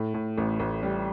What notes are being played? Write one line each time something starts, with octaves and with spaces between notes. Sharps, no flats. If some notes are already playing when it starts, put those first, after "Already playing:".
Already playing: A2
A2
A1
A1
G3